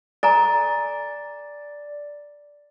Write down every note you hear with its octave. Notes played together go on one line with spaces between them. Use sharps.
A4 D5 G#5 A#5